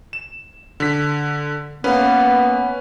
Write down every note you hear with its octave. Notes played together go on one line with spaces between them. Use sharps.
E7
D3 B6
A#3 B3 C#4 B4